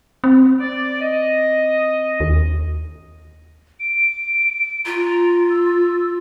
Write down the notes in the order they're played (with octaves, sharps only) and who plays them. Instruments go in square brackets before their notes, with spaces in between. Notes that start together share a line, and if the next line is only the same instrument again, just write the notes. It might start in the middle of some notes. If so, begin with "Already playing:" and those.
[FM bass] C4
[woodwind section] D5
D#5
[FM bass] D#2
[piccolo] D7
[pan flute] F4 [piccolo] A#5
[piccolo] E6